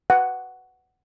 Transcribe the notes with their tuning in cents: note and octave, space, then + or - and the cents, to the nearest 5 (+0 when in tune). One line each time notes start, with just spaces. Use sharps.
F#5 +5